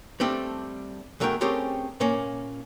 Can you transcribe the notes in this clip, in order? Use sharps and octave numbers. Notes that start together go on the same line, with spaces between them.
G3 A3 C4 D4 A4
E2 F#3 A3 A#4 C#5 G5
A3 C4 C#4 G4 G#4 A#4
A#2 A#3 C#4